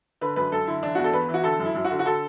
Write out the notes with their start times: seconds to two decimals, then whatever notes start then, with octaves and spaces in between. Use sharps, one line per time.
0.21 D3 B4
0.36 F#2 B4
0.52 F#2 A4
0.67 D3 E4
0.83 E3 D4
0.95 E2 F#4
1.04 A4
1.13 E2 B4
1.29 E3
1.34 F#4
1.44 D3 A4
1.59 F#2
1.65 E4
1.75 F#2
1.85 F#4
1.90 D3
1.99 F#4
2.06 D3 A4